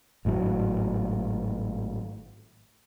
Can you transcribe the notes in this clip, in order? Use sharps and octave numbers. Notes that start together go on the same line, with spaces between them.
G#1 A2 F#3